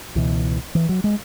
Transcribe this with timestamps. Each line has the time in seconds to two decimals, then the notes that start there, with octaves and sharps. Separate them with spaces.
0.15 C#2 B2 E3
0.75 E3
0.89 F#3
1.04 G#3